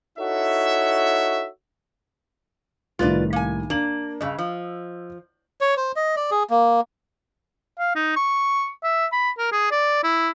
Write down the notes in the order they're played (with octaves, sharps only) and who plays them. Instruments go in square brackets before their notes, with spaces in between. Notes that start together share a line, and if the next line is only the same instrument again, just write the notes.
[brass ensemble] D#4 E4 F#4 A4 C#5 E5
[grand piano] C2 A2 D#3 [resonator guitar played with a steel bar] F4 B4 D5
[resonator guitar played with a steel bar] A#3 G#5
[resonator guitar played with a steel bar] A#3 [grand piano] D4 F#7
[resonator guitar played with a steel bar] G2 C#3 [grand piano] D#5 E6
[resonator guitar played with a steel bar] F3
[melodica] C#5
C5
D#5
D5
G#4
A#3
[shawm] F5
D#4
C#6
E5
B5
A#4
G#4
D5
E4